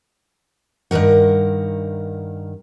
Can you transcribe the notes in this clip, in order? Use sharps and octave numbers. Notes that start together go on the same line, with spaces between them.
G2 D#3 F3 A#4 F#5